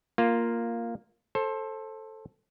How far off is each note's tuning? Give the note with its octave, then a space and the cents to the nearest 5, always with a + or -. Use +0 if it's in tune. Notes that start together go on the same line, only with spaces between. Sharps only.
A#3 +0 F4 +0
A4 +0 C5 +25